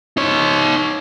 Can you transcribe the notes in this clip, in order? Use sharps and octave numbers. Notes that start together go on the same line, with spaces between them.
D#4 C#5